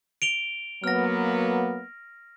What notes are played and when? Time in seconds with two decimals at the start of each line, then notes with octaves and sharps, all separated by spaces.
0.22 D7 F7 G7
0.84 F#3 A#3 B3 F6 A#6